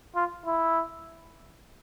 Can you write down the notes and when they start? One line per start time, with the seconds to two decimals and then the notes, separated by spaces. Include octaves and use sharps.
0.15 F4
0.46 E4